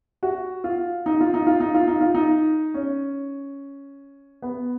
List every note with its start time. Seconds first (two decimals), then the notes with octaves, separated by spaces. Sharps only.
0.23 F#4
0.64 F4
1.06 D#4
1.21 F4
1.34 D#4
1.47 F4
1.60 D#4
1.74 F4
1.88 D#4
2.01 F4
2.15 D#4
2.74 C#4
4.42 B3